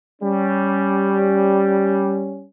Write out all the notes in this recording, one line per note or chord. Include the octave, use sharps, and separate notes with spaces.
G3 C#4